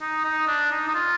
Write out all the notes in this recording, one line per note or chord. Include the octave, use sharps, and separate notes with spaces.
D#4
D#4
D4
D#4
D#4
F4